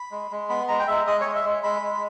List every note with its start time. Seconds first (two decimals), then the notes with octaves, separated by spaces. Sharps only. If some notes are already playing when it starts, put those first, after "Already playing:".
Already playing: B5
0.12 G#3
0.31 G#3
0.49 B3 B5
0.68 G#3 A#5
0.79 G5
0.87 G#3 E5
1.07 G#3 D#5
1.21 G#3 C#5
1.35 E5
1.44 G#3
1.63 G#3 B5
1.82 G#3